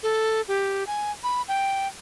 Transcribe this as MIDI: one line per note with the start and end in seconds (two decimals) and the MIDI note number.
0.03 0.42 69
0.48 0.84 67
0.87 1.11 80
1.24 1.42 83
1.48 1.88 79